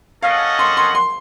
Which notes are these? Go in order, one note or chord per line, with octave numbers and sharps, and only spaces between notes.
C#4 A4 D#5 F5 F#5
C6
C6
C6